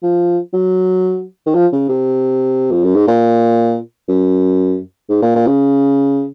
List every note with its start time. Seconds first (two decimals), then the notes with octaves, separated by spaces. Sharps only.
0.03 F3
0.53 F#3
1.46 D#3
1.55 F3
1.73 C#3
1.89 C3
2.71 F2
2.84 F#2
2.96 G#2
3.08 A#2
4.08 F#2
5.09 G#2
5.22 A#2
5.36 A#2
5.47 C#3